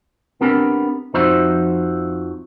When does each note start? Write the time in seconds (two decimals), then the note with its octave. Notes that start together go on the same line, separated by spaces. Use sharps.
0.41 B3 C4 D4 G4 A#4
1.14 F2 F3 D#4 F#4 C5 E5